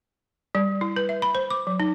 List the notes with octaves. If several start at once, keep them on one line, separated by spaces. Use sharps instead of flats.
G3
E4
B4
E5
B5
C5
D6
F#3
D#4